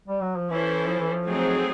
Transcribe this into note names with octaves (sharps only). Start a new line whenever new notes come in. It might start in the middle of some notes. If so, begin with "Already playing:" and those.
G3
F#3
F3
E3 C#4 E4 A4 C5
F3
E3
F3
F#3 A3 C4 D#4 G#4